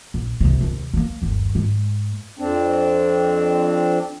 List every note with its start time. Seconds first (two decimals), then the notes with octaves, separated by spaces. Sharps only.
0.14 A#1
0.40 C2 C3
0.61 D#2 C3
0.94 A3 A#3
1.22 G1 D#2
1.55 G#2 G#3
2.39 F2 C4 D4